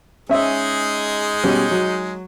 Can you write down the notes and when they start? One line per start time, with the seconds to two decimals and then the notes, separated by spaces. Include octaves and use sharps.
0.29 G#3 C#4 D#4 G#4 E5 E6
1.44 B2 G3 C#4
1.71 F#3